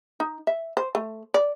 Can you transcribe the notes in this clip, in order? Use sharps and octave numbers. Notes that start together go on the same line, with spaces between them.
D#4
E5
C5
A3
D5